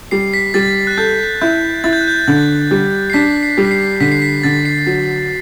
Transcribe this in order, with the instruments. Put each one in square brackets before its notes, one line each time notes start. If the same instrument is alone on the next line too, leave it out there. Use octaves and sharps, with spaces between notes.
[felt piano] G3 [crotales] C7
[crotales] B6
[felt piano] G3 [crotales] A6
[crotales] F#6
[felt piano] A4 [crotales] G6
[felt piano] E4 [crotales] G6
[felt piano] E4 [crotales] A6
[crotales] G6
F#6
G6
[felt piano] D3 [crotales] A6
[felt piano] G3
[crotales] C7
[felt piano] D4 [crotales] B6
[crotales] C7
[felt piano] G3
[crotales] B6
C7
[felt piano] D3 [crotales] B6
[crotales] C7
B6
[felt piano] D3 [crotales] A6
[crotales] C7
[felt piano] F#3